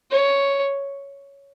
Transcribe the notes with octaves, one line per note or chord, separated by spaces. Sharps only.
C#5